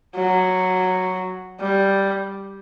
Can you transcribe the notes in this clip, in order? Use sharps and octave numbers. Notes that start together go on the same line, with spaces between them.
F#3
G3